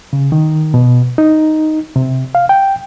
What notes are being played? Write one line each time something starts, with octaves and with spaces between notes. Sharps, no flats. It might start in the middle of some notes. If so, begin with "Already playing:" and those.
C#3
D#3
B2
D#4
C3
F5
G5